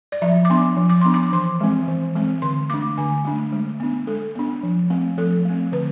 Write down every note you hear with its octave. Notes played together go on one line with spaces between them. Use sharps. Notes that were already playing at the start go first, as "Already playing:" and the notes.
D5
F3 E5
D6
B3 D4 C6
F3
D6
B3 D4 C6
D6
E3 C6
G#3 C4
E3
G#3 C4
D3 C6
A3 D4 D6
D3 G#5
A3 D4
G#3
B3 D4
G#3 A4
B3 D4
F3
A3 C4
F3 A4
A3 C4
D3 B4